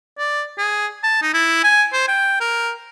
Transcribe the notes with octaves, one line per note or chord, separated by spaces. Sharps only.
D5
G#4
A5
D#4
E4
G#5
C5
G5
A#4